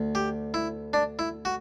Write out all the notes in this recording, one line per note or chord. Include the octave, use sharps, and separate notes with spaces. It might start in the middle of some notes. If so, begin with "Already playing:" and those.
Already playing: D2
G4
E4
D4
E4
F#4